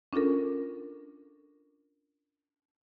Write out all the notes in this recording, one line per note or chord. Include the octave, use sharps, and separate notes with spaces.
C#4 D4 F4 A4 A#4